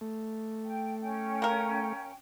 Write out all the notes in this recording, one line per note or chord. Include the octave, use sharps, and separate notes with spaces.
A3
G5
C#4 G5
A#3 A#4